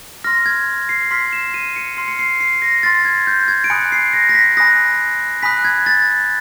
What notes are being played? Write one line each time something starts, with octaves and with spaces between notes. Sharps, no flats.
C6 F6 A#6
G#6
C7
C6 F6 B6
E7
D#7
C#7
C6 F6 C7
C#7
C7
C7
A#6
C6 F6 A6
G#6
G6
G#6
D7
G#5 B5 D#6 F#6 C#7
C7
A#6
A#6
B6
G#5 B5 D#6 F#6 A#6
G#5 B5 D#6 F#6 B6
G#6
A6